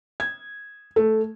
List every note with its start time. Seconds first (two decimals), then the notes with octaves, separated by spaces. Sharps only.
0.20 G#6
0.96 A3